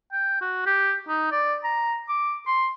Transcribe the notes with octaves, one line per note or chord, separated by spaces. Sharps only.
G5
F#4
G4
D#4
D5
A#5
D6
C6